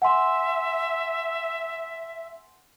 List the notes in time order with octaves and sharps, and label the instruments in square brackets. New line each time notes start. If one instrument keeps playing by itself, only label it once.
[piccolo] E5 [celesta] F#5 G#5 C6